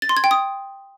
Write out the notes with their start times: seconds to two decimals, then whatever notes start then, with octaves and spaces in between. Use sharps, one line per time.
0.02 A6
0.09 C6
0.17 G#6
0.24 G5
0.31 D#6